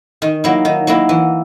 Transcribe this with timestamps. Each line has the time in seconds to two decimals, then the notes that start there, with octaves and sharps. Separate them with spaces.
0.22 D#3
0.44 F#3 A#3 E4
0.65 D#3
0.87 F#3 A#3 E4
1.09 E3